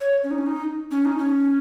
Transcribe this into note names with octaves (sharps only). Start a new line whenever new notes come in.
C#5
C#4
D#4
C#4
D#4
C#4
D#4
C#4